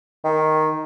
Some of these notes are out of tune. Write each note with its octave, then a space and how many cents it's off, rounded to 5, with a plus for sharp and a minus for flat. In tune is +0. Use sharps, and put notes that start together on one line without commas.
D#3 +0